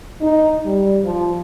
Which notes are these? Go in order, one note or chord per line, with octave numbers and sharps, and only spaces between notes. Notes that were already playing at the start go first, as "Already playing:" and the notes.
D#4
G3
F3